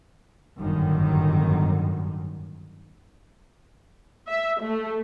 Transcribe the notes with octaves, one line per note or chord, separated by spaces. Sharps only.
G1 F#2 A2 D3 D#3 G3
E5
A3